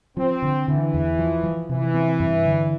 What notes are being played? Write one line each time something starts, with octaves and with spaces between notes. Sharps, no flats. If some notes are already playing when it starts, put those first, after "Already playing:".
F3 C4
D3
D3 E3
E2
F3
F3
C3 E3
C4
G2
D3